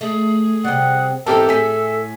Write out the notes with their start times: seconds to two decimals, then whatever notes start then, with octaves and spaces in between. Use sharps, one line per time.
0.01 A3 G#4
0.65 C3 G3 F#5
1.26 E2 G#2 C4 G4 A4 A#4 E5 A5
1.49 A2 G#4 G#5 B6